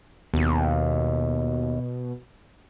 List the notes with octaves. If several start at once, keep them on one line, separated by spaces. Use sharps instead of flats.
D#2 B2